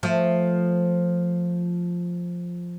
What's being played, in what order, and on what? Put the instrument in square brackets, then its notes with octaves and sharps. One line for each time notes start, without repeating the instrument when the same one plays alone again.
[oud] F3 A3